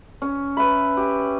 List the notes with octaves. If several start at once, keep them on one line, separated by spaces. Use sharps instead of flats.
C#4
B4 E5 B5
G4